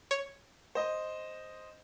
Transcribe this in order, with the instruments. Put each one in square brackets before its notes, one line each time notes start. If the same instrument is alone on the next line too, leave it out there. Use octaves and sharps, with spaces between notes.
[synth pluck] C#5
[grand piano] C5 D#5